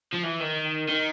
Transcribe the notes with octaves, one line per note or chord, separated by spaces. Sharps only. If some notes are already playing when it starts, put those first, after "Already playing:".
F3
E3
D#3
D#3